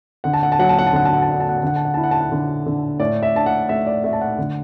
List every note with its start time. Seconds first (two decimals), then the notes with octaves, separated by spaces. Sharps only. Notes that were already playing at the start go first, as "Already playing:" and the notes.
0.24 D3 F#5
0.33 A5
0.43 F#5
0.52 A5
0.59 F#3 F#5
0.69 A5
0.79 F#5
0.87 A5
0.93 D3 F#5
1.05 A5
1.13 F#5
1.22 A5
1.28 D4 F#5
1.40 A5
1.49 F#5
1.58 A5
1.63 D3 F#5
1.76 A5
1.85 F#5
1.94 E4 A5
2.04 F#5
2.11 A5
2.21 F#5
2.32 D3
2.66 D3
3.00 A2 D5
3.23 E5
3.35 D4 A5
3.46 F#5
3.69 A3 E5
3.87 D5
4.04 A3 E5
4.13 A5
4.21 F#5
4.38 D3